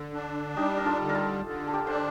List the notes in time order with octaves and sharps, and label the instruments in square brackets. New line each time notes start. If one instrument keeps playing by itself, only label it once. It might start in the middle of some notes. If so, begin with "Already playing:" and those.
Already playing: [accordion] D3
D4
[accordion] G3 [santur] D#4 G4
[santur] A#4
F4 A4
[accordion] D3
[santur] A#4
F4 A4
[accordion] D3
[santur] A4
G4 A#4
[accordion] D4 [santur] C5
[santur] D5